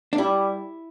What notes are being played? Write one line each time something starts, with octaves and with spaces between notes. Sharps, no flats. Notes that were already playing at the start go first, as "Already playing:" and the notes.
D4
G3 E4